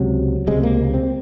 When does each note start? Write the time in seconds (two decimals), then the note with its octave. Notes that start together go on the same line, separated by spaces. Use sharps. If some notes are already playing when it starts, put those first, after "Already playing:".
Already playing: C#2 C3 F#3
0.47 C#2 C3 G#3
0.63 A#3
0.94 C4